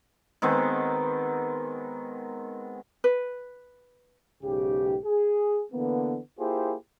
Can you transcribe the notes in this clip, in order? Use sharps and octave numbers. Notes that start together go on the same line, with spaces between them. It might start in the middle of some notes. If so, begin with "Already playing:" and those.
D#3 G#3 B3 C4
B4
B1 G#2 C#3 G4
G#4
D3 E3 A#3 B3
A#3 E4 F4 G4 G#4 C5